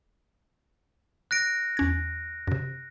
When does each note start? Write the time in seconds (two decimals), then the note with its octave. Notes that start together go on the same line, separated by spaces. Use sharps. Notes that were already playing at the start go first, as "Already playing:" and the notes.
1.31 F#6 A#6 D7
1.77 E2 C#4 G#6
2.47 F#2 C3